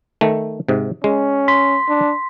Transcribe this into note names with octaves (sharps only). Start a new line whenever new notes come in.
D#3 A3
G#2 C3
G#3 C#4
C6 B6
D4